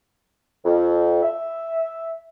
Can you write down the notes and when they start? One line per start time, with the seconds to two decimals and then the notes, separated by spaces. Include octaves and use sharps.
0.64 F2
1.23 E5